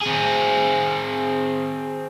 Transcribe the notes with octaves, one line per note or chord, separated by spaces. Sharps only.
C4 G#4